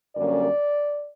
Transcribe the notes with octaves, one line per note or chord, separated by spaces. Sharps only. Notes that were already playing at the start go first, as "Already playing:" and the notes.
F#2 D3 G3 A#3 C#4 D5